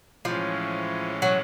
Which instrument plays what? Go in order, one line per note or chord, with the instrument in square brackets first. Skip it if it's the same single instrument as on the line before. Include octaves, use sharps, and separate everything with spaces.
[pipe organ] A2 E3 G#3 C#4 [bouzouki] F3
[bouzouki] F#3